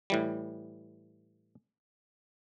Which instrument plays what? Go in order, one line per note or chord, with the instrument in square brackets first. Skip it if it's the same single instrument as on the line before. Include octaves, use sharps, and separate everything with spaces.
[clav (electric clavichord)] A2 E3 G3